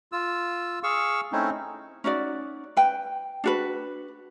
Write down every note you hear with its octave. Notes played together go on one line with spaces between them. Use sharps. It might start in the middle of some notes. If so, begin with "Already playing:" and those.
F4 E6
G#4 F5 C#6 E6
A3 C4 C#4 D#4 E4
C#4 D#4 F#4 D5
B4 G5
D4 F#4 B4